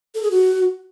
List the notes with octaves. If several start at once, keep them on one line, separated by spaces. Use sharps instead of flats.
A4
G#4
F#4